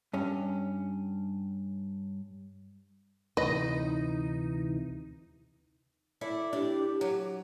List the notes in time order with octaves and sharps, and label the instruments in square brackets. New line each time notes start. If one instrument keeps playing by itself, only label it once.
[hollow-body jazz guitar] G2 C#4
[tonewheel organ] D2 C3 E3 [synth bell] D#4 [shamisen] B4 [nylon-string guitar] D#5
[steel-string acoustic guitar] E4 A4 D5
[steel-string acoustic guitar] D4 [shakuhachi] G4
[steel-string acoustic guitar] F#3